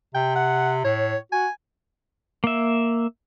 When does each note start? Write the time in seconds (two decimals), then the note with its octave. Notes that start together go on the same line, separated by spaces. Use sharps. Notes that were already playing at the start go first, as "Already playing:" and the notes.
0.15 C3 G5
0.36 F#5
0.84 A2 C#5
1.32 F#4 G#5
2.44 A#3 E5